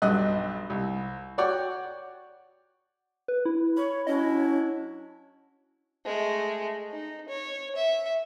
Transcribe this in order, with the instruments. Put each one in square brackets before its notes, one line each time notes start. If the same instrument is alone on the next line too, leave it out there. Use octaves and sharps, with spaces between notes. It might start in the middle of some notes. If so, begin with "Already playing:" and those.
[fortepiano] B1 G2 D#5 F#6
C2
F#4 C#5 D5 F#5 G5
[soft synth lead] B4
E4
[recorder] C#5 [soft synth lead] B5
[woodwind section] F#3 D4 E4 [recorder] C#4 [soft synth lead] D#5
[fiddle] G#3 A3
D#4
C#5
E5